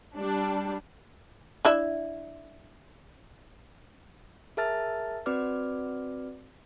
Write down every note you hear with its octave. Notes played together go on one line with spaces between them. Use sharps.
G3 D4
D4 E4 E5
G#4 A#4 E5 A5 F6 A6
C4 F#4 B4 D5 D6 F6